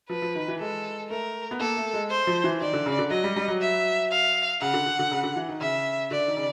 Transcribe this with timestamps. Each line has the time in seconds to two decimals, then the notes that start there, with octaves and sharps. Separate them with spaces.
0.09 F3 B4
0.22 F3
0.36 D#3
0.48 E3
0.60 G#3 A4
1.10 A3 A#4
1.51 B3
1.60 A#3 A4
1.77 A3
1.94 G#3
2.11 C5
2.27 F3
2.44 E3
2.61 D#3 D5
2.73 D3
2.86 C#3
2.99 D3
3.10 F#3 D#5
3.24 G3
3.36 G3
3.48 F#3
3.61 E5
4.11 F5
4.61 C#3 F#5
4.74 D3
4.86 D3
4.99 D3
5.11 C#3
5.23 D3
5.36 E3
5.49 D#3
5.61 C#3 E5
6.11 D3 D5
6.28 D#3
6.37 C#3